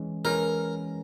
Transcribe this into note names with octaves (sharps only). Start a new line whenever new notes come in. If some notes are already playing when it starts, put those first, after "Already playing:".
Already playing: E3 G#3 C#4
E3 G#3 C#4 A#4